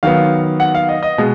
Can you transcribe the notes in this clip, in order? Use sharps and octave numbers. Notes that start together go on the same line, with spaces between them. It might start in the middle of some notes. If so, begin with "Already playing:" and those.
D#3 F#3 B3 F5
F#5
F5
D#5
D#5
B2 G#3